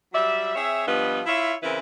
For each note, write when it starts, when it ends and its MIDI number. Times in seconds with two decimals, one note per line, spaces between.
0.13 0.54 54
0.13 0.54 55
0.13 0.54 74
0.13 0.54 76
0.55 0.83 60
0.55 0.83 68
0.55 0.83 73
0.55 0.83 76
0.86 1.21 43
0.86 1.21 53
0.86 1.21 55
0.86 1.21 59
0.86 1.21 71
0.86 1.21 75
1.26 1.54 64
1.26 1.54 65
1.26 1.54 73
1.26 1.54 76
1.62 1.79 49
1.62 1.79 52
1.62 1.79 60
1.62 1.79 64
1.62 1.79 70
1.62 1.79 71